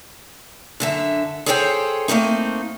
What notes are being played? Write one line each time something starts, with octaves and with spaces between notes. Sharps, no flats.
F#2 D3 E5
G#4 A4 C5 C#5 F#5 G5
A3 A#3 C4 D#4